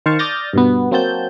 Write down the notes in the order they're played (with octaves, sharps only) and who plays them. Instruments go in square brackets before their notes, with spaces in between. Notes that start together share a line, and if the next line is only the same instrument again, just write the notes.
[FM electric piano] D#3 C5 F5 A5 C#6
D5 D#6 F6 G6 A6 A#6
G2 B2 B3
F#3 A#3 C4 F#4 A5 G6